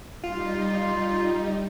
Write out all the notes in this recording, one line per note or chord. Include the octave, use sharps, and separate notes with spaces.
G3 D#4 F4